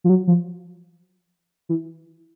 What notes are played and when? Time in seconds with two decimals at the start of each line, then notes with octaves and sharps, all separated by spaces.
0.04 F3
0.09 F#3
0.27 F3
1.69 E3